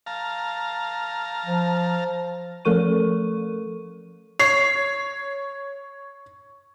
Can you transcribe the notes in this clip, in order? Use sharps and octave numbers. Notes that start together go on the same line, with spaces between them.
F5 A5 A#5
F3
F3 A3 A4 A#4 C#6 D#7
C#5 C7